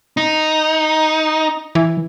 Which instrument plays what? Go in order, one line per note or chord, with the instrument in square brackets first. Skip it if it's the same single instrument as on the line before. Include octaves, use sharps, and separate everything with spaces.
[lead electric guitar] D#4
[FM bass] E3